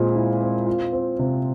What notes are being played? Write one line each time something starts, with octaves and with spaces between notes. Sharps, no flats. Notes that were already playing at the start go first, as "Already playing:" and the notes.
Already playing: A#2 G#3 C4
E4
C4
F4
C4
C3